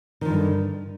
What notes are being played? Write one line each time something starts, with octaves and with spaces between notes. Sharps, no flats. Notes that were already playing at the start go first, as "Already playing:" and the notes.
G2 D3 D#3 F3